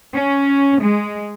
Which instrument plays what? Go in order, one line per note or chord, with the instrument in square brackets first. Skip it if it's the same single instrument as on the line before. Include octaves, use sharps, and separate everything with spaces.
[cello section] C#4
G#3